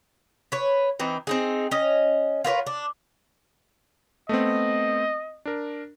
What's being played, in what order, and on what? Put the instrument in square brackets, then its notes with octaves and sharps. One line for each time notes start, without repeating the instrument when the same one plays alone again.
[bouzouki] B4 C#5
E3 C4 D#4
C4 D#4 G#4
C#4 D#5
F4 A#4 B4 C#5
D4
[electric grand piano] A3 B3 C4 [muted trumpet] D#5
[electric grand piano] D4 A#4